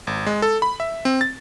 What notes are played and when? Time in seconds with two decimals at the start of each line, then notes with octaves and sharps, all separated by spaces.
0.07 G#1
0.26 G#3
0.42 A4
0.62 B5
0.80 E5
1.05 C4
1.21 A6